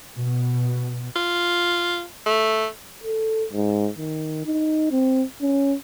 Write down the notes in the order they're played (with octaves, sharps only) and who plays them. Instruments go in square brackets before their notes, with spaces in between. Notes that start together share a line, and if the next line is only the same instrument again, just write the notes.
[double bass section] B2
[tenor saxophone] F4
A3
[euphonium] A4
G#2
D#3
D#4
C4
C#4